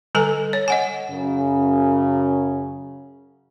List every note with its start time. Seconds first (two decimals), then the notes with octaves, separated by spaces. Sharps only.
0.15 D3 G3 A4 B4 G#5
0.53 C#5
0.68 D#5 F#5 G#5
1.11 F#2 C#3